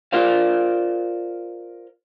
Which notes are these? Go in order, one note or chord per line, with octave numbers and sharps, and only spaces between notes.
F4 A#4 C5 D5 F5